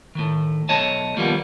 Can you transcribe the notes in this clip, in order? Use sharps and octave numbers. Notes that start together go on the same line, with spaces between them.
A2 D#3
B1 A3 C#5 D#5 A5
D#2 F3 G3 A#3 B3